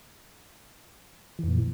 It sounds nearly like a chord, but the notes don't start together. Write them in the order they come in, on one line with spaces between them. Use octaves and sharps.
E3 F2 A#2